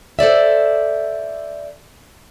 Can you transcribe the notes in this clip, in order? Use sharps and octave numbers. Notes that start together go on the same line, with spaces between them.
A4 C5 D5 E5